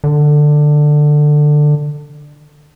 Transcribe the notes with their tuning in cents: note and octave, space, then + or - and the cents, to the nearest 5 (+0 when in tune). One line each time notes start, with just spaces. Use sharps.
D3 +15